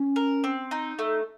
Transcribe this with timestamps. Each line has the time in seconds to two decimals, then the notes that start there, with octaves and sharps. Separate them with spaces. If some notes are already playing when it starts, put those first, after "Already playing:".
Already playing: C#4
0.16 A#4
0.44 C4
0.71 D#4
0.99 A3